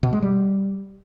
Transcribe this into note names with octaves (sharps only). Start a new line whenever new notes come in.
B2
G#3
G3